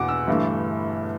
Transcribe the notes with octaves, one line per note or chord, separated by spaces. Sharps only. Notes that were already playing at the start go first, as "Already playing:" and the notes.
Already playing: E1 E2 B2 F#5 D6
E6
G1 G2 E3 A3